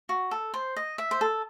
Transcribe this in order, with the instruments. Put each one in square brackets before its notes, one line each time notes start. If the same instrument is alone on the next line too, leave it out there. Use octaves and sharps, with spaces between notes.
[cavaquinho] F#4
A4
C5
D#5
E5
C5
A4